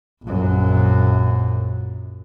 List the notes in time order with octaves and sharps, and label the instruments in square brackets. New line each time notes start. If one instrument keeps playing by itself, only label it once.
[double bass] A#1 F#2